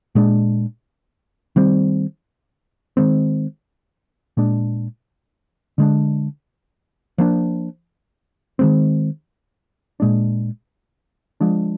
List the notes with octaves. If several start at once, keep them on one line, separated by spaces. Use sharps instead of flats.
A#2 G#3 D4
D#3 G3 C4
D#3 G#3 C4
A#2 G#3 D4
D3 G#3 D4
F3 A#3 D4
D#3 G#3 C4
A#2 G#3 D4
F3 G#3 D4